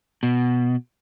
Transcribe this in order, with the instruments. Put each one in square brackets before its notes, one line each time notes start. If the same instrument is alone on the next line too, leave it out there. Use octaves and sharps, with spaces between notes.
[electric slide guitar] B2